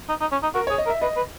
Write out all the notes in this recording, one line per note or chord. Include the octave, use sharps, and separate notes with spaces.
D#4
D#4
C#4
D#4
F#4 A#4
C#5
G#4
D#5
A#4
E5
B4 D#5
B4